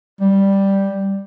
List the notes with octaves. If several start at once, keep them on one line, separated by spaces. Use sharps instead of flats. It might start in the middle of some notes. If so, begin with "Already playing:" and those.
G3